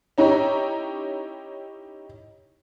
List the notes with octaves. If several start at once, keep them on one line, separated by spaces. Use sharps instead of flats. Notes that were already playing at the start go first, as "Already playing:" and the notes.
C#4 D#4 E4 G4 C#5 A#5